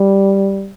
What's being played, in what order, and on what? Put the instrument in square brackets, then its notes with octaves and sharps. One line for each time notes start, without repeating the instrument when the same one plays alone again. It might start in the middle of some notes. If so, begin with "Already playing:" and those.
Already playing: [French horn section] G3